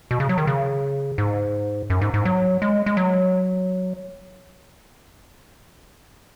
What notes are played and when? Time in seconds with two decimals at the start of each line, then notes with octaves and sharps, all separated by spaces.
0.11 B2
0.20 C#3
0.29 F#3
0.38 D#3
0.47 C#3
1.18 G#2
1.90 F#2
2.01 G#2
2.14 G#2
2.25 F#3
2.62 G#3
2.86 G#3
2.97 F#3